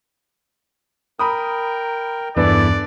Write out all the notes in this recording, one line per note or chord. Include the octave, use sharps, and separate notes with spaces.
A#4 G5 A#5 B5 D#6
E2 G2 E3 D4 E4 A4 B4 D5